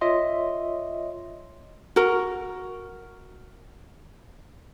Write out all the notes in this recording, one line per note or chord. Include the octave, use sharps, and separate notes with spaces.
F4 C#5 D#5 E5 C6
F#4 A#4